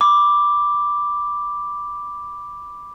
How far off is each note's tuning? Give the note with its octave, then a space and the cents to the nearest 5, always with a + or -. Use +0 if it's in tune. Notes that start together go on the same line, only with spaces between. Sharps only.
B5 -5 D6 +0